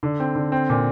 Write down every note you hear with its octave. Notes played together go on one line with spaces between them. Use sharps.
D3
C4
D3
C4
A#2